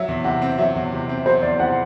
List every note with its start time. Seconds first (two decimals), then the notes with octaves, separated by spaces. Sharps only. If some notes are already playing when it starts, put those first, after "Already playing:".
Already playing: F#3 E5
0.08 E2
0.24 C3 F#5
0.42 C4
0.58 F#3 E5
0.76 E2
0.92 C3
1.09 C4
1.26 F#3 C5
1.43 E2 D5
1.59 C3 F#5